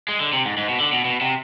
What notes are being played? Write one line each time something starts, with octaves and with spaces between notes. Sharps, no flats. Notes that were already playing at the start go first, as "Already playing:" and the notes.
G#3
D3
C3
G#2
G#2
B2
D3
B2
B2
C3